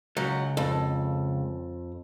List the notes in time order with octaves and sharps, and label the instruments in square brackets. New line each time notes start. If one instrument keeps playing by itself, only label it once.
[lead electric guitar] C#2 [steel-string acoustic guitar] F#3
[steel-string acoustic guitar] F2